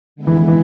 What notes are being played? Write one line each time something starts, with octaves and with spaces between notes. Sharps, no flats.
D3 G#3 B3 E4
E3
E3
E3